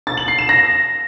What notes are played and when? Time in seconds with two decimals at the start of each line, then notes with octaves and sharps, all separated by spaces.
0.07 A6
0.17 F#7
0.28 C7
0.39 E7
0.49 A#6